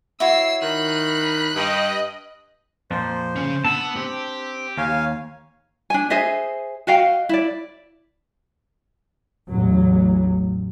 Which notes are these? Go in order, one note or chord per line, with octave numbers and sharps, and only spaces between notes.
E4 F#4 C#5 E6 C7
D#3 B5 F#6
G2 D#5
F2 A#2 F3 C5
C#3 C#4
B3 D4 A5 E6
C4 G4
D#2 C#5 F5 G#5
D4 G#5
G#4 C5 D#5 E5
F#4 D#5 F5 G5
E4 D5
A1 E2 F#3